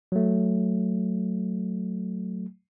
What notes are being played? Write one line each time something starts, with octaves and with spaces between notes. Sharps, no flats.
F#3 A3